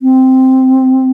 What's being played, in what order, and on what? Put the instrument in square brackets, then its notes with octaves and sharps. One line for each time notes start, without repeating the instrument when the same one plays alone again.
[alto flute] C4